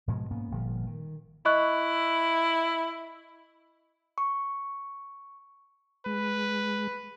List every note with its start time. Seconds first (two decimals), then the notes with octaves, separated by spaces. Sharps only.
0.08 G#2 B2 F3 G#3
0.31 G#2 A#3 B3 C#4
0.51 G1 A#2 F3
0.87 D#3
1.46 E4 D#5 C#6 F#6
4.18 C#6
6.06 G#3 B4